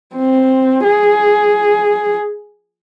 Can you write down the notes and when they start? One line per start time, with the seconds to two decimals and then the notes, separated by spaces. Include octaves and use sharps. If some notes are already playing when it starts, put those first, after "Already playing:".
0.16 C4
0.84 G#4